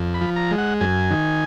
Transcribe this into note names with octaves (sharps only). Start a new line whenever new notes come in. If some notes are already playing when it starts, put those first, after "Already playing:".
Already playing: F2
B5
F3
A#5
G#3
F#5
F#2 G#5
D#3